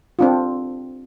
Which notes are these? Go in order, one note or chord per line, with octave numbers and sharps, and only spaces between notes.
C4 D4 F4